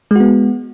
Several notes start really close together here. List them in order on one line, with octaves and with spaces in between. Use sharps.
G#3 F#4 B3